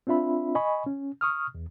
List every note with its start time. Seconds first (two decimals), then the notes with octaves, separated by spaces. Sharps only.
0.07 C4 D4 F4 E5 B5
0.55 D#5 G#5 B5 C#6
0.86 C#4
1.21 C#6 D#6 F6
1.55 E2